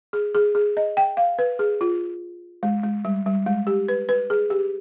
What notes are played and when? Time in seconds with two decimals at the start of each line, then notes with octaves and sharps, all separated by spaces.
0.13 G#4
0.35 G#4
0.55 G#4
0.77 D#5
0.97 G5
1.17 F5
1.39 B4
1.59 G#4
1.81 F4
2.63 G#3
2.84 G#3
3.05 G3
3.26 G3
3.46 G#3
3.67 G4
3.88 B4
4.09 B4
4.30 G#4
4.50 G4